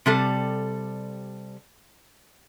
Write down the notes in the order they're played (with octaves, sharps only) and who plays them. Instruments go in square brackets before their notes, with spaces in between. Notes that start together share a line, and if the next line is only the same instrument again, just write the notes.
[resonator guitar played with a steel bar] C3 G3 A4